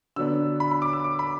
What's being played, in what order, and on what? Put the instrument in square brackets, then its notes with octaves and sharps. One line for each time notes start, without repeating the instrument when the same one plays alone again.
[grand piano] D3 F#3 B3 D4 E6
B5
B5
D6
E6
D6
B5